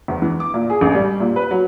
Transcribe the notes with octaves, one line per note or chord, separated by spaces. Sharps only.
E2
E3
D6
A#2
G#4
A1
G3
A#2
B4
F#3